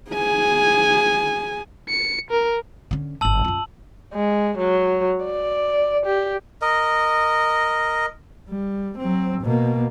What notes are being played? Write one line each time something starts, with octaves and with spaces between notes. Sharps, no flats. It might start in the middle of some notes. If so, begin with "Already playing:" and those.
G#4 G#5
C#7
A#4
D3 C#4
G1 G#2 A5 E6 F#7
F#2 F4
G#3
F#3
D5
G4
A#4 D#5
G3
F#3 C4
B2 A#3